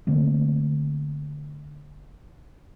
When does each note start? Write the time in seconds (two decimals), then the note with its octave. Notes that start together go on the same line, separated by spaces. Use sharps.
0.07 D3 A3 A#3 C4